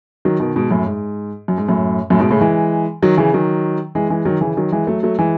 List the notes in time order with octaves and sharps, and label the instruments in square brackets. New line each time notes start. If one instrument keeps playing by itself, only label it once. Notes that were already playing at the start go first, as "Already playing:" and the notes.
[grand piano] D#3 F#3
B2 D#3
G#2 B2
F#2 A2
G#2
F#2
G#2
F#2 A2
F#2 A2
G#2 B2
A2 C#3
E3 G#3
D#3 F#3
C#3 E3
D#3 F#3
E3 G#3
E3 G#3
D#3 F#3
C#3 E3
D#3 F#3
E3 G#3
F#3 A3
F#3 A3
E3 G#3